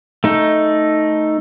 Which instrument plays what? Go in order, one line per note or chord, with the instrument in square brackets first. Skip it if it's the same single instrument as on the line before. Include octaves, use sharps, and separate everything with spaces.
[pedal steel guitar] A3 D#4